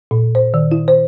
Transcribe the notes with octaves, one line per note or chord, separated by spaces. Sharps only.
A#2
C5
D#3
E4
C5